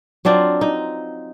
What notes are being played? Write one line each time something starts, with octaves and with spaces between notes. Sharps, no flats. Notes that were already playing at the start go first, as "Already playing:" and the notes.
F#3 C4 D4 F4
D#4